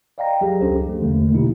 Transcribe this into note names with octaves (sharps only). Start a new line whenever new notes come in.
D5 D#5 F5 G5 A#5 A#6
F#3 G4 G#4
C#2 C#4 D4 G4 A4 C5
F3 A3
E2 D3 A3 A#3
B2 D3 F3 D#4 E4 G4